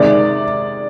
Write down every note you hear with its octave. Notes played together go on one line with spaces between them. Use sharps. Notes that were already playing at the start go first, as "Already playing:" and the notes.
Already playing: C3 D#3 G#3 D5